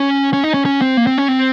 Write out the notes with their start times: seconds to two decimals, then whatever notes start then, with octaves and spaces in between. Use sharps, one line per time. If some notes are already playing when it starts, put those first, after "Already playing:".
Already playing: C#4
0.33 C#4
0.44 D#4
0.54 C#4
0.65 C#4
0.82 C4
0.97 A#3
1.07 C4
1.18 C#4
1.28 C4